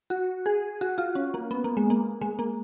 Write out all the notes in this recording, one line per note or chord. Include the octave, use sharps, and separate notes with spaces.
F#4
G#4
F#4
F4
C#4
A#3
B3
A#3
G#3
A#3
G#3
A#3